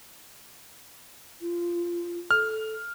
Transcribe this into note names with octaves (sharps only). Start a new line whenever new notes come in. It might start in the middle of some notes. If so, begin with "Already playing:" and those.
F4
A4 F6